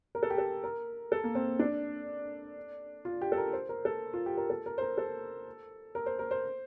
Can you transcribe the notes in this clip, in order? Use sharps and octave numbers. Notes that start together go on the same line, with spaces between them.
A#4
A4
G4
A4
A#4
A4
A#3
C4
D4
F4
G4
A4
A#4
C5
A#4
A4
F4
G4
A#4
A4
A#4
C5
A#4
A4
A#4
C5
A#4
C5